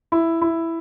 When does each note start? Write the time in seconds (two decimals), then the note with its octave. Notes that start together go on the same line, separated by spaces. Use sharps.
0.12 E4
0.42 E4